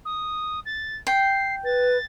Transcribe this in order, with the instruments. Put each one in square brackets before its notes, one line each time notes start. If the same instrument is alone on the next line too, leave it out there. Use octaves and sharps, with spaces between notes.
[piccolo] D#6
A6
[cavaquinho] G5 [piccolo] C7
[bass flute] B4 [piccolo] A6